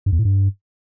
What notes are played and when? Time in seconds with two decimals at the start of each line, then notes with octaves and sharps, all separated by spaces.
0.06 G2
0.12 E2
0.19 A2
0.25 G2